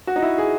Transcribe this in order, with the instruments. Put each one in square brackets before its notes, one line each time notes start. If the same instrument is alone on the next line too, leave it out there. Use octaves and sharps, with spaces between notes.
[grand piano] F#4
D#4
E4
G#4